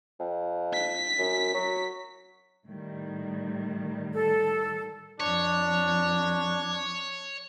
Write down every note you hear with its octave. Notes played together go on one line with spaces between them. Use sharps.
F2
B6
F#2
F#3
A2 D#3 G3
A4
F2 D4 C#5